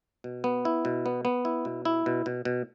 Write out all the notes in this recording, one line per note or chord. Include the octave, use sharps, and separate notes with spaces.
B2
B3
E4
B2
B3
B3
E4
B2
E4
B2
B2
B2